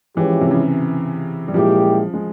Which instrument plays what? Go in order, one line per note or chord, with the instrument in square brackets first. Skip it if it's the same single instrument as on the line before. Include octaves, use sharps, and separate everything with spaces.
[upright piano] E3 [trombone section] F3 G#3 C#4 E4 G4
[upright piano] C3
C#3
G3
[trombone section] A#2 G#3 E4 G4 [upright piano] F3
[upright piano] G#3